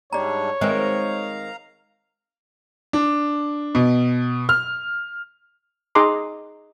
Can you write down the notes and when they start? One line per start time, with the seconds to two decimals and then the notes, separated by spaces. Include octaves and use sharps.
0.13 G#2 G3 D4 C#5 D5 A#5
0.61 D#3 G#3 C4 B4 C5 F5 A#5
2.93 D4
3.75 B2
4.49 F6
5.95 D#4 G#4 D#5 A#5 C6 D6